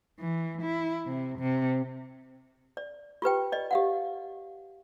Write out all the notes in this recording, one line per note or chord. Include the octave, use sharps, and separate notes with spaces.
E3
E4
C3
C3
D5
F4 G4 B4 G5
D5 D#5
G4 F5 F#5